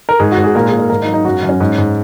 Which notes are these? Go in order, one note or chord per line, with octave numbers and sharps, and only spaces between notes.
A#4
G#2 G#4
F#4
G#2
G#4
A#2 A#4
A#2 G#4
A#4
G#2 A#4
D#4
F#3
D#4
F#2 F#4
F#2
C#4
G#2
G#2